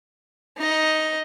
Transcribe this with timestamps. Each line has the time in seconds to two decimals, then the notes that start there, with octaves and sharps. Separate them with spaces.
0.57 D#4 D#5